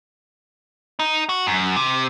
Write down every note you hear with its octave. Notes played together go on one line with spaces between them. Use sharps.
D#4
F#4
F#2
C3